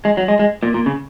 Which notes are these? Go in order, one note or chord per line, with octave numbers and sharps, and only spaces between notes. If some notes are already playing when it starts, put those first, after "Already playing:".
G#3
F#3
G#3
G#3
A#2
A#2
C#3